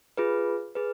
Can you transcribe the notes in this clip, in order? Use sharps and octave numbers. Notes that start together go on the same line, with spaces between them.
F4 G#4 B4
G#4 B4